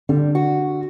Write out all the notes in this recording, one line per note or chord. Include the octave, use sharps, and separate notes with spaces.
D3 G3
F#4